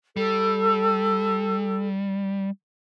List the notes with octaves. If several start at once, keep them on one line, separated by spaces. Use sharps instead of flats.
G3 A4